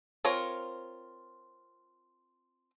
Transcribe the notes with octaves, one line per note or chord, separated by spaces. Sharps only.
C4 F4 A#4 C#5